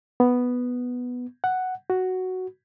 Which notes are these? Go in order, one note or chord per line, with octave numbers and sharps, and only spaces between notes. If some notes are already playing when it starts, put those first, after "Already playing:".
B3
F#5
F#4